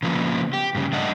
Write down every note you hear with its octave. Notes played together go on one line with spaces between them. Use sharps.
C#3 F3 A#3 B3
G4
G2 C#3
G3 A3 D4 D#5 F#5